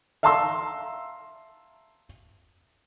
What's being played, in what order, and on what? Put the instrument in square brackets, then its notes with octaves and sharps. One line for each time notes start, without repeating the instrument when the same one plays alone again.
[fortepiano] E5 F5 A5 A#5 C6 E6